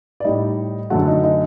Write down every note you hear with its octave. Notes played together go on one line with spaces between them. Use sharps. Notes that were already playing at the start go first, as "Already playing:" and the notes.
D5
A2 G3 D#4 D#5
F#2 D3 F#3 A3 F#4 F#5
D#4 D#5
D#4 D#5